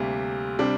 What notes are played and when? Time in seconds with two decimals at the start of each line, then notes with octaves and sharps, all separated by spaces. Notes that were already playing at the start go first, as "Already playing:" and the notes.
Already playing: D2 C3 G3 A#3
0.59 C3 G3 D4